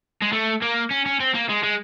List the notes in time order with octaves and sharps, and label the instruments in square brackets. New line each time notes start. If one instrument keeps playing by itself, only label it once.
[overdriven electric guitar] G#3
A3
A#3
C#4
C#4
C4
A#3
G#3
G#3